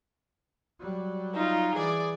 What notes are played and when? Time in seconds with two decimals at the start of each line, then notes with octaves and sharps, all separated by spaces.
0.80 F#3 G3
1.34 D#4 F4
1.75 E3 G#4 D5